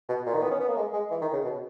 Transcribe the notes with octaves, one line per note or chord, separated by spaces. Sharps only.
B2
A#2
D#3
B3
C#4
B3
A#3
G#3
G#3
E3
D#3
C#3
B2